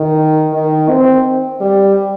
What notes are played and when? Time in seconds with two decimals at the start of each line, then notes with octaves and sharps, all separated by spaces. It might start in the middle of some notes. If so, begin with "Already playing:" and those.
Already playing: D#3
0.53 D#3
0.89 C4
1.60 G3